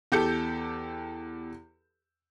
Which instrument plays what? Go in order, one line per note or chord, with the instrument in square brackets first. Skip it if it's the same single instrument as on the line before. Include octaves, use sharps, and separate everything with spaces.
[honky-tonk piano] E2 G4 A4 G6 C#7